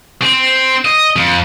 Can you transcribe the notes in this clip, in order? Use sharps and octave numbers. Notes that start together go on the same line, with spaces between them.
C4
D#5
F2